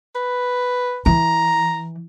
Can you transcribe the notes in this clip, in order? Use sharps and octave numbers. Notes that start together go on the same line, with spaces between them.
B4
E3 A#5